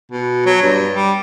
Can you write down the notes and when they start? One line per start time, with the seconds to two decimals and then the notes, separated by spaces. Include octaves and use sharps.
0.11 B2
0.46 F#3
0.62 G2
0.92 G3